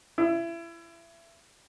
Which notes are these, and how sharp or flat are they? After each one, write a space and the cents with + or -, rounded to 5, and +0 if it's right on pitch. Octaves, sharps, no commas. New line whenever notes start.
E4 +30